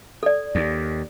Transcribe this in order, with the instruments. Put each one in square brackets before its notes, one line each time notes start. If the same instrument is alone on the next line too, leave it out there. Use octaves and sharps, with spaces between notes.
[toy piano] A4 D5
[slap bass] D#2